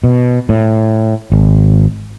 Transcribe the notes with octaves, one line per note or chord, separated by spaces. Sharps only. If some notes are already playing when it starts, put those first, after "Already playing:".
B2
A2
G#1